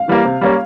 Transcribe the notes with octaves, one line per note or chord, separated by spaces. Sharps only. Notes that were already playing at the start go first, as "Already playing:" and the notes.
Already playing: F5
E3 G3 A#3
C3
G3 A#3 C#4